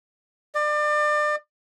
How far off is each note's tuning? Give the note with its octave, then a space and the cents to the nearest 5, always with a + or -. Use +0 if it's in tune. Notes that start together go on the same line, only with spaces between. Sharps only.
D5 +30